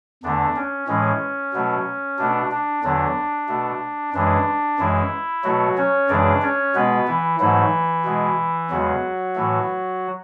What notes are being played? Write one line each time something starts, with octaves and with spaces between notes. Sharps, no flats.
E2 D3 A3 D4
C#4
A2 E3 G#3 C#4
B2 F#3 A3
B2 A3 D4
D4
E2 D3 F#3 D4
B2 A3
F#2 E3 G#3 D4
F#2 E3 G#3 E4
B2 F#3 A3 F#4
C#4 C#5
F#2 C#3 E3 G#3 D4 D5
C#4 C#5
B2 G#3 B3 B4
E3 E4
G#2 E3 F#3 A3 E4
B2 G#3
E2 C#3 F#3 G#3 F#4
A2 E3 A3